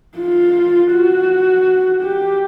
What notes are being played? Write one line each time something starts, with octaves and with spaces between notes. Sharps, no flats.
F4
F#4
G4